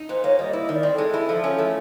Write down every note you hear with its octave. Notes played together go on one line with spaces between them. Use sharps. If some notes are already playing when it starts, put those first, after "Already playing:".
Already playing: D#4
A#2 C5
A#3 C#5
G3 D#5
E4 D#5
D#3 D5
C4
G#3 A4
E4
F3
C#4
A3